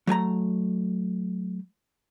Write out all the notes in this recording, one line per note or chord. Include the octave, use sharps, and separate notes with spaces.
F#3 A3 G#5 A#5